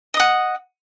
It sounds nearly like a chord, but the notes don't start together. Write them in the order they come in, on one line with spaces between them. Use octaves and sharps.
D#5 D#6 F#5